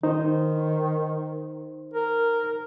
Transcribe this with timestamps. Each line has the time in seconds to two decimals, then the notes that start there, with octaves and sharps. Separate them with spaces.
0.03 D#3 D#4 C5
1.94 A#4